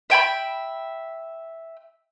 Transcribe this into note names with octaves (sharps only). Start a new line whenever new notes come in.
E5 G5 G#5 B5